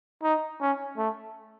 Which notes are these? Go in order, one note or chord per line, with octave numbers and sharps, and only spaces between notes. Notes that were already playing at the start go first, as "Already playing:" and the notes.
D#4
C#4
A3